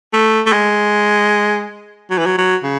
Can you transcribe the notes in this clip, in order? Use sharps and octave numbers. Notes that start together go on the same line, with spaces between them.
A3
A3
G#3
F#3
E3
F#3
F#3
C#3